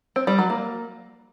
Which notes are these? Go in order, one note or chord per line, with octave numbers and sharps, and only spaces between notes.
C4
G3
F#3
A#3